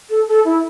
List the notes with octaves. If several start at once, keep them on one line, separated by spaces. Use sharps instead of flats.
A4
A4
E4